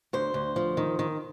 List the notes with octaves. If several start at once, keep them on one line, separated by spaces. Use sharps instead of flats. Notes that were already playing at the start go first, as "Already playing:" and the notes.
D2 C5
D2
F3
D#3
D#3